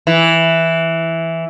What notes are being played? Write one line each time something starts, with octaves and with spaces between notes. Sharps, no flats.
E3